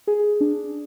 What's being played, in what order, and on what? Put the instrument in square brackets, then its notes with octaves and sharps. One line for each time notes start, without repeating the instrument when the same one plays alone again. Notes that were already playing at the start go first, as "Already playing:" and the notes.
[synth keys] G#4
D4